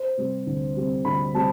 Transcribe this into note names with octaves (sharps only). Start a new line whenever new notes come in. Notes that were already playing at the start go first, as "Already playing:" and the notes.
Already playing: C5
C3 G3 C4
D2
C3 G3 C4
D2 B5
C3 G3 C4 A5